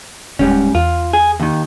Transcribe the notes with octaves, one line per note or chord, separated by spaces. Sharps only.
D1 G#2 G3 C#4
E2 F4
G#4
D#2 D#3